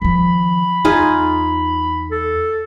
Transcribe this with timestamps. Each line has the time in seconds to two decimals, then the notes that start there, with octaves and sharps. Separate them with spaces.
0.02 D#3 F3 B5
0.85 E2 D#4 F4 G#4
2.11 A4